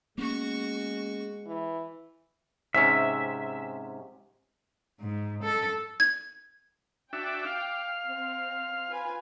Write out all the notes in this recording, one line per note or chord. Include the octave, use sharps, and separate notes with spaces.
G#3 A#3 B3 C#4 F#4 C#6
E3
G#2 C3 C#4 E5
G#2
A4
G#6
D4 F#4 E5 G5 D6
F5
C4
F4 B4 G#5